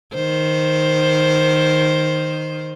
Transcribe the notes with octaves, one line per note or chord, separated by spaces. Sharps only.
D#3 C5